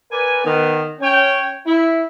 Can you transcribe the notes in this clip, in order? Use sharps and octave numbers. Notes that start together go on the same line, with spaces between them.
A#4 B4 D5 G#5
D#3 B3
C#4 C#5 G5
E4